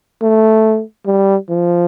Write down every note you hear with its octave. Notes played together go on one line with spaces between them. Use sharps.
A3
G3
F3